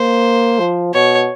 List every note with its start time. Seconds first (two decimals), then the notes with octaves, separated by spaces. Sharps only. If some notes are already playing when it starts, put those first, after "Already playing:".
Already playing: A#3 C5
0.60 F3
0.94 B2 C#5